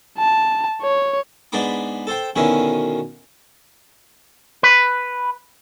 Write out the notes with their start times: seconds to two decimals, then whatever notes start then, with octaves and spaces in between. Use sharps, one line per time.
0.19 A5
0.83 C#5
1.52 G#2 B3 D4 B5 D6
2.07 A4 C5 G5
2.36 B2 D3 D#3 C#4 E4
4.63 B4